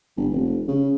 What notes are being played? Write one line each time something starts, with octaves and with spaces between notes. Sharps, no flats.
G1
F1
C#3